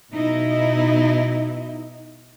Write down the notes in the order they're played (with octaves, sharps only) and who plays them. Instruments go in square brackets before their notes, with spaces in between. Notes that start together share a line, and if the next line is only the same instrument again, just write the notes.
[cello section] B2 D#4 E4